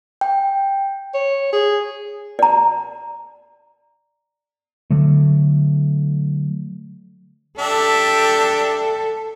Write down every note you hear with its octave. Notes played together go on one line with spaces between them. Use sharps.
G5
C#5
G#4
D5 A#5
D3 F#3 A3
D4 G4 A4 E5